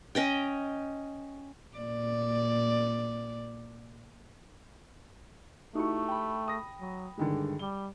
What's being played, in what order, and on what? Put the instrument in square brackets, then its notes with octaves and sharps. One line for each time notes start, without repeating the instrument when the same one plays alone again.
[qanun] C#4 D#5 G5
[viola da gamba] A#2 D5
[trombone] A3 [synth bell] D#4 E4 [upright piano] F#4 G4 C#6
[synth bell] G5 B5
[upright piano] D#6 A#6
[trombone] F#3
[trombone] G2 [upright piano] D3 D#3 G#3
[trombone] G3 [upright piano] G7